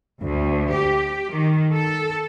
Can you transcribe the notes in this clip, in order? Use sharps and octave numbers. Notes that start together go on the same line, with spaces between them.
D2
G4
D#3
A4